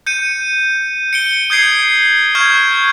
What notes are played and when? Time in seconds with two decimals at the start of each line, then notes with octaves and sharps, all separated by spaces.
0.07 G6 C#7 D#7
1.13 C#7 D7 G7
1.50 D#6 G6 G#6 C7 D7
2.35 C#6 F6 G6 G#6